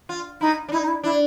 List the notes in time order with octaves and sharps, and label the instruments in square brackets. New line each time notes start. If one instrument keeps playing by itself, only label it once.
[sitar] F4
[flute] D#4 [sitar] E4
[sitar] D4
[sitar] D#4 [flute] E4
[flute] D#4
E4
[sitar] D4 [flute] E4